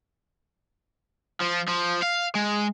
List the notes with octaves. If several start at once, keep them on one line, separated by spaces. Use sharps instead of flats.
F3
F3
F5
G#3